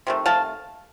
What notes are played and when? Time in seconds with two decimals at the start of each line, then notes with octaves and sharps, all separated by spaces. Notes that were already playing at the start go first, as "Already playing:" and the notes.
0.07 C3 D#3 A3
0.26 F5 A5